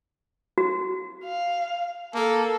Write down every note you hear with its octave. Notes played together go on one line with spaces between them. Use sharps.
F#4
F5
A#3 A4